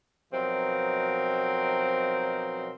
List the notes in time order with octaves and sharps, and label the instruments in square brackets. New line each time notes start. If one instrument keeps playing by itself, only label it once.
[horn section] B2 F3 F#3 C4 D#4 A#4